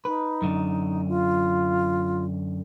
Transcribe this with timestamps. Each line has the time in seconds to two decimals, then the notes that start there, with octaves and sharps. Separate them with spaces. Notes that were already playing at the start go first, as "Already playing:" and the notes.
0.05 D#4 B4
0.42 F#2 D3
1.09 F4